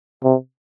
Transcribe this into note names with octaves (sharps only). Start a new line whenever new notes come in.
C3